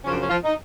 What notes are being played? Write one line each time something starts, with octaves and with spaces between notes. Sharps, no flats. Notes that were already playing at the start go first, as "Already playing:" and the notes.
F#2 C#3 F3 C#4
D4
C#4
F3 F4
D#4